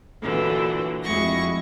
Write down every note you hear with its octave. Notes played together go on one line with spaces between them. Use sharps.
A#2 D3 E3 F#3
F2 G#3 E4 F#4 C#6 A#6